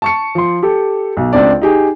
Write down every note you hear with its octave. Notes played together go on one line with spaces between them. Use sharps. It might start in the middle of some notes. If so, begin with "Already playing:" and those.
A5 C#6 C#7
F3 C6
G4 A4
B1
C#2 C4 D4 D5
D#4 G4 G#4